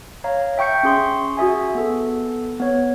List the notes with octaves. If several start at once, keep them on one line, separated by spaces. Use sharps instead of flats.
C#5 F5 A#5
E5 G5 C#6 G6 C#7
C#4 G#4 C6 C#6
F#4 G#4 E5 G#5
B3 A4
B3 C#5